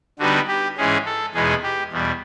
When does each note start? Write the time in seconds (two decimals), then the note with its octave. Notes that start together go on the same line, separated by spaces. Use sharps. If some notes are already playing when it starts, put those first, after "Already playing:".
0.19 D3 G3 B3 D#4 F#4
0.48 G4
0.77 G#2 E3 G#3 C#4 G#4
1.06 A4
1.34 E2 B2 G#3 B3 D#4 G#4
1.63 G4
1.92 E2 B2 G3